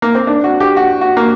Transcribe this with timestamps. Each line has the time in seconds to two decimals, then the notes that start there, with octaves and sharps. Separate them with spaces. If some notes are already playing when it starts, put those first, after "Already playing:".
0.02 A#3
0.15 C4
0.27 D4
0.44 F#4
0.60 G4
0.76 F#4
1.01 F#4
1.17 A#3